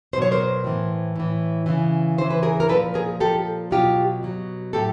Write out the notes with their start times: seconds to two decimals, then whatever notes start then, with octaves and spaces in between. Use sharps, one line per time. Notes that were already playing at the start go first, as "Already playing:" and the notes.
0.13 B2 C5
0.18 F#3 C#5
0.31 A#4 C5
0.64 A2 E3
1.16 A2 E3
1.66 C#3 E3
2.18 C#3 E3 C5
2.30 B4
2.43 G#4 A#4
2.60 A#4
2.68 A#2 F3 A4 B4
2.94 G#4 A#4
3.20 A#2 F3 G4 A4
3.71 B2 F#3 F4 G4
4.23 B2 F#3
4.73 A2 F#3 G4 A4